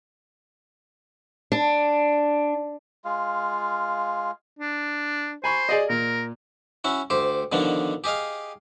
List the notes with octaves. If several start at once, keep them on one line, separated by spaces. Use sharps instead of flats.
D4
G#3 F4 F5
D4
C5 G#5 B5 C#6
G#4 D5 D#5
A#2 A#4
C#4 E4 F#4
D2 G4 C5
B2 D3 D#3 F3 D4
G4 G#4 D#5 F5